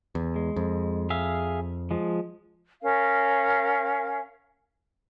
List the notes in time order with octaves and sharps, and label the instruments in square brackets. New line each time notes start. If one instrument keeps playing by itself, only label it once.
[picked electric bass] E2
[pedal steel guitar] G#3
[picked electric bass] F2
[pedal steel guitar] G#4 E5 F5
F3 G#3
[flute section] C#4 A#4 F5